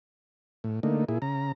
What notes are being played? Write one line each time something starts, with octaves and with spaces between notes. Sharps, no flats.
A2
D3 A3 A#3 D#4
A#2 E4 G#4
C#3 A#5